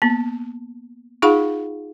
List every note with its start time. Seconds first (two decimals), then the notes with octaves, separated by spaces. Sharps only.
0.02 A#3 B3
1.22 D#4 F4 G#4 F5 F#5 B5